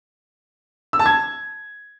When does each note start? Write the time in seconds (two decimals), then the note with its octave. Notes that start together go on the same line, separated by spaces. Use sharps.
0.93 E6
0.99 A5
1.06 G#6